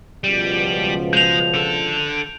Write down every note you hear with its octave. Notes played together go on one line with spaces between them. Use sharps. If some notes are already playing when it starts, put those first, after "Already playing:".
C#2 B2 F3 G3
G#3 G6 F7
D3 A4